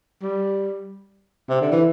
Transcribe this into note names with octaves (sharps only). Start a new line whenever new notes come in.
G3
C3
D3
E3